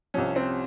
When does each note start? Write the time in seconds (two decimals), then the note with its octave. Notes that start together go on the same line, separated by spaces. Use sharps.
0.14 C2 C3 F3 C#4
0.36 C4